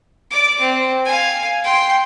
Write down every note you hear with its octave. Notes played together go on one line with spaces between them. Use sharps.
D5 D6
C4
F5 G#5
G5 C6